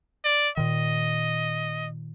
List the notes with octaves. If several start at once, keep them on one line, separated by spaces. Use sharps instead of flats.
D5
A#2 D#3 D#5